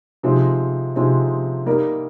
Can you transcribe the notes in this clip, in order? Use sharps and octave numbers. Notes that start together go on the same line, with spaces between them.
C3 F3 G#3 C4 D#4
C3 F3 G#3 C4 D#4
G3 A#3 D#4 A#4